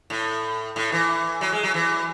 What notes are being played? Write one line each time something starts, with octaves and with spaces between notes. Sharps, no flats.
A2
A2
E3
F#3
G#3
F#3
E3